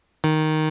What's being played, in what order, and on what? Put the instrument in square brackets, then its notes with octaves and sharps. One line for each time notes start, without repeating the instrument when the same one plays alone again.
[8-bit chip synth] D#3